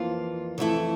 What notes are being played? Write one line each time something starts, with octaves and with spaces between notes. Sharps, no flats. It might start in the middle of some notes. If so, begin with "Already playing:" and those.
Already playing: F2 E3 A#3 F4
F2 E3 A3 E4 A4